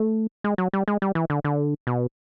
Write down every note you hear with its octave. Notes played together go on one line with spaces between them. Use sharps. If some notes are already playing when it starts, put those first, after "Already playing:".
Already playing: A3
G#3
F#3
G3
G#3
G3
E3
D3
D3
B2